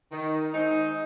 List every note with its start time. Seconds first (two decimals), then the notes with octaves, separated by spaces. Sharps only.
0.12 D#3
0.53 G#3 C4 D#4